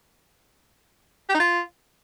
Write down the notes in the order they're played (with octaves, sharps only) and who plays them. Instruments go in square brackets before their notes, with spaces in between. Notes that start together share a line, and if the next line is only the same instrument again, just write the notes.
[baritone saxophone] G4
D#4
F4